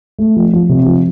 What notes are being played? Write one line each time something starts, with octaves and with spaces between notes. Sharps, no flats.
A3
F3
F3
C3
F3